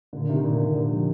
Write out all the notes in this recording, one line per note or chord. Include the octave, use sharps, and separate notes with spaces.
A#2 D3
C3 D#3
A#2 D3
A#2 D3
A#2 D3
D3 F3